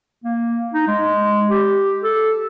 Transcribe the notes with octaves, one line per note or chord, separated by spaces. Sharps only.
A#3
D#4
G#3
G4
A4